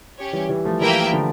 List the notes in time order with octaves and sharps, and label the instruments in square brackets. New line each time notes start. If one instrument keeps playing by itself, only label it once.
[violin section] C#4 G4 C#5
[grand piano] E3 G3
E3 G3
F3 A3
[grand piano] E3 G3 [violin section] A#3 E4 A#4 E5 G5
[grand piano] D3 F3